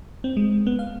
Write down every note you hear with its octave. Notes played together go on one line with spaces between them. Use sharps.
C4
G#3
B3
F5